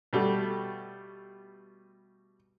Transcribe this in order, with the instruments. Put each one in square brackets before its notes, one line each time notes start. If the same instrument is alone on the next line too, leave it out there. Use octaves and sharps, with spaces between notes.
[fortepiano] B2 G3 A3